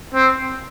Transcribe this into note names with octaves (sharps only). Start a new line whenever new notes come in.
C4